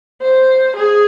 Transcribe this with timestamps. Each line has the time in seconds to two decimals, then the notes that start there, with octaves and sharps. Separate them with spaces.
0.22 C5
0.77 G#4